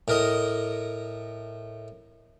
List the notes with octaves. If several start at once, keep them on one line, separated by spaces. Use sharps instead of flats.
A2 A#4 D#5